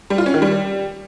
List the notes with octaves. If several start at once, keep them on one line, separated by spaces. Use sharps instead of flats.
G3
F4
C#4
D#3
G3